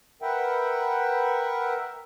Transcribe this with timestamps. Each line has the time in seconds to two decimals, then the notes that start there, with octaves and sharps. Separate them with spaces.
0.22 A#4 B4 E5 F#5 G5